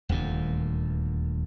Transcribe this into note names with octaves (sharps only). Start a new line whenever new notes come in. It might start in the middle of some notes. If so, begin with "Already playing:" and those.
D#1 D2 A#2